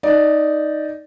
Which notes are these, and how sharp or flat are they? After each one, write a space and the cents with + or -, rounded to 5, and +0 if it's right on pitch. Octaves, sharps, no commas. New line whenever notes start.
D#4 +0 D5 +0